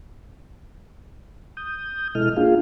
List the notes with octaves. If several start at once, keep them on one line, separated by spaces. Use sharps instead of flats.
D#6 G6
B2 G#3 E4 A4 D#5 F6
A#3 D4 F4 G#4 F5